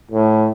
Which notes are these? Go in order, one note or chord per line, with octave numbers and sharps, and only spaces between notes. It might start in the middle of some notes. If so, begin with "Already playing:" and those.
A2